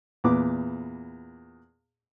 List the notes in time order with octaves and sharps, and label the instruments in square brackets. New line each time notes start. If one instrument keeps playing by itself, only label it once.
[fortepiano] E2 A#2 B4 D6